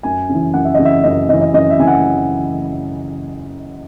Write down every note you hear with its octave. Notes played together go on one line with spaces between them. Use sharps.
F#2 G#5
C#3 E3
F#2 F#5
E5
C#3 E3 D#5
E5
F#2 D#5
C#3 E3 D#5
D#5
F#2 D#5
E5
C#3 E3 G#5
F#5